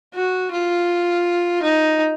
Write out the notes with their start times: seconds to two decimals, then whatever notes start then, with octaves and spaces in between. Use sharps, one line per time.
0.15 F#4
0.51 F4
1.63 D#4